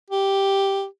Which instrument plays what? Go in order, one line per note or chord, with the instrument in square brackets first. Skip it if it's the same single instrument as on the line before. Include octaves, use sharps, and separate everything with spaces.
[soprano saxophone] G4